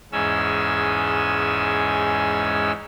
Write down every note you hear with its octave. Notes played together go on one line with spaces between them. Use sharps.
E2 G#2 G#3 C#4 G#5 E6